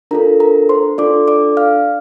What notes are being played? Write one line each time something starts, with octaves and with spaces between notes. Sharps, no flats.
D4 F4 A4 A#4 A#5
A#4 A#5
C5 C6
D4 F4 A4 D5 D6
D5 D6
F5 F6